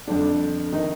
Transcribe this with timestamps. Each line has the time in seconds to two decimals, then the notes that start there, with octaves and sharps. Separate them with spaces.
0.07 F2 D3 D4
0.72 D#3 D#4